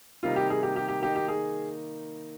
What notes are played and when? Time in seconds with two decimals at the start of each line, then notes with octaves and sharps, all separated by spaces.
0.23 C3 D#3 G3 A#3 D#4 F4
0.36 G4
0.50 G#4
0.63 G4
0.76 G4
0.88 G4
1.02 D#3 A#3 D#4 G4
1.15 G4
1.28 G#4